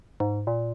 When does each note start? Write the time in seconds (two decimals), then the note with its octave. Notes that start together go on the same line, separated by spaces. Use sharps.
0.20 G#2
0.47 A#2